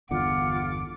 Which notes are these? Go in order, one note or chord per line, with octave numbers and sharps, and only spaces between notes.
G1 E2 D3 F4 F#5 D6